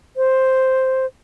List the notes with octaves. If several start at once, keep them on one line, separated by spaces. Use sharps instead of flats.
C5